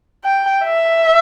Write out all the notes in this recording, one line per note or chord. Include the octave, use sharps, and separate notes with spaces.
G5
E5